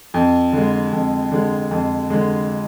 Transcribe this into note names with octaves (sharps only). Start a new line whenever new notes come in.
F2
D3 G#3
F2
D3 G#3
F2
D3 G#3